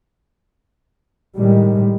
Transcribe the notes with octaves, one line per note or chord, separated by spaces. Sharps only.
A2 D#3 G3 G#3